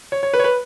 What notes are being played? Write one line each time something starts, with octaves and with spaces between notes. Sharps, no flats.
C#5
C#5
B4
C#5
B4